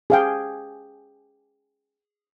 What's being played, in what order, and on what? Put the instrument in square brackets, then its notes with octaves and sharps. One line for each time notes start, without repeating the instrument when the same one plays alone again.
[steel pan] G#4 F5 G5